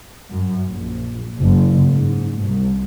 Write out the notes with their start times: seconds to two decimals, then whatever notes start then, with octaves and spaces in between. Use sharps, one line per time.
0.31 F#2
0.67 A#1
1.40 F#1
1.92 G#2
2.43 C2